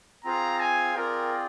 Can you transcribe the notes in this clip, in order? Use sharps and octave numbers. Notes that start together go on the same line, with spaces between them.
C4 F4 G#4 C5 F5 A#5
G#5
C4 F4 G#4 A#4 D5 G5